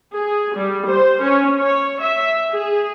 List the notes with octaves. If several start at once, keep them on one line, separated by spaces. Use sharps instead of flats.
G#4
G3
C5
C#4
C#5
E5
G#4